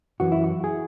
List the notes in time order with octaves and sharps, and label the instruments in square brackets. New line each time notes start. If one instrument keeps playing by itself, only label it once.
[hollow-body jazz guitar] F#2 E3 F#4
E4
F#4
G#4